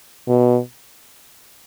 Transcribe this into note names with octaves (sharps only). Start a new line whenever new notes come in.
B2